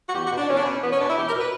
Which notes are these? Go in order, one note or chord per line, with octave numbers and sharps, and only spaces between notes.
F#4
E2 G4
F#4
B2
D4
E2 C#4
D4
B2 C#4
E2 B3
C#4
B2 D4
E4
E2 G4
A#4
B2
B4